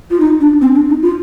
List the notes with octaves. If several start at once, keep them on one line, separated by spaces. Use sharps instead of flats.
F4
D#4
D4
C4
D4
D#4
F4